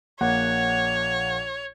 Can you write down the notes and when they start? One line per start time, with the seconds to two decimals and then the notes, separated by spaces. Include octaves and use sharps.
0.21 A#1 A#3 C#5 F#5